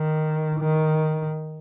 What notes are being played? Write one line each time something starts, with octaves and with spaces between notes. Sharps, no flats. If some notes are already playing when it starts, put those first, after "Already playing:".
Already playing: D#3
D#3